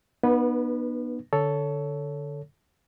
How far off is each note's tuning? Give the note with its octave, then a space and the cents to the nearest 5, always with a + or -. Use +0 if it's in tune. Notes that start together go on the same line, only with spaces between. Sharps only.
B3 -25 D#4 -45 B4 +0
D3 +0 A4 +0 C#5 +20